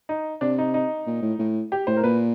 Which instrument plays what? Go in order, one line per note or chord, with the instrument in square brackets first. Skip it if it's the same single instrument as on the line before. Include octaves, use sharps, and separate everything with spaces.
[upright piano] D#4
[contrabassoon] C3 [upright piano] D4
[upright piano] D#4
D#4
[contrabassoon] A#2
A2
A2
[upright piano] G4
[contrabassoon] A2 [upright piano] C5
[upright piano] A#4
[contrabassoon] A#2 [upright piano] B4